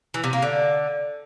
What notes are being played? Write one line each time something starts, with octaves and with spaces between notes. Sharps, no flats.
E3
C3
A#3
D3